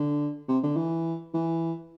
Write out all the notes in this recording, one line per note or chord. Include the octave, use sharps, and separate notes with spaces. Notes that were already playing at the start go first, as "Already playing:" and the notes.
Already playing: D3
C3
D3
E3
E3